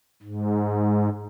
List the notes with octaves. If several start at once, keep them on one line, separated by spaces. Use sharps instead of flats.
G#2